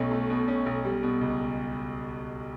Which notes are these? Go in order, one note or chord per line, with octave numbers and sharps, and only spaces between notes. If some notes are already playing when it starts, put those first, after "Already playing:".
Already playing: B1 B2 A3 C#4
A3
B2
C#4
B1
G3
B2
C#2